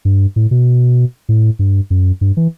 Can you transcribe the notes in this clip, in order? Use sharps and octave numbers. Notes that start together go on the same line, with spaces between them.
G2
A2
B2
A2
G2
F#2
G2
E3